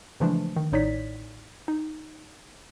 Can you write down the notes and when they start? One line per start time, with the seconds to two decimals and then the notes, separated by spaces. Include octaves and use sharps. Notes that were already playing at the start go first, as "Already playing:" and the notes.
0.20 C#3 E3 F3 G#3 A3 D4
0.56 D#3
0.72 A1 A2 D#4 C#5 D5 B6
1.68 D#4